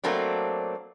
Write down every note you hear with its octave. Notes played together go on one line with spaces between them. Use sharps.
F#3 A3 A#3 C4 D4